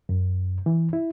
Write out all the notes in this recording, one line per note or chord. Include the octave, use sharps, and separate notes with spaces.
F#2
E3
E4